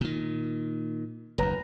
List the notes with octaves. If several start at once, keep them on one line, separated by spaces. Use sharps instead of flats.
A#2 D#3
F#1 D#2 B4 A#5